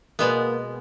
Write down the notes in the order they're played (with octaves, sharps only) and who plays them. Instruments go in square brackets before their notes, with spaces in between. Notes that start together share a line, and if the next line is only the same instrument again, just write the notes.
[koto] B2 G#3 B3 [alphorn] A#3